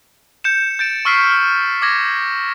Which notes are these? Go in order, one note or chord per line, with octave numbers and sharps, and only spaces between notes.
G6 C#7 E7
G6 A6 D7 E7
C#6 E6 F6 B6 C7 D7
F6
D6 E6 G#6 A#6 E7